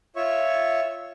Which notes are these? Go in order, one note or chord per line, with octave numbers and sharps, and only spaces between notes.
F4 C#5 E5 C#6